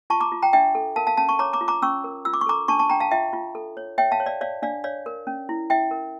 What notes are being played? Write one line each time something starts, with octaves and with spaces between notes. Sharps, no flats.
F4 A5 C#6
A#5 D6
F4
G5 A#5
D4 E5 G5
A4
A#4 F5 A5
F5 A5
C#4 F5 A5
A5 C#6
C#5 A#5 D6
A#5 D6
F4
A#5 D6
C#4 C#6 E6
A#4
F4 E6
D6
C#6
A4 A#5 D6
D4 A5 C#6
A5 C#6
D4 G5 A#5
F5 A5
F4 E5 G5
F4
A4
C#5
C#5 E5 G5
F5 A5
C#5
D5 F5
C#5 D5 F5
D4 D5 F5
C#5 D5 F5
A#4
C#4
E4
E4 E5 G5
A#4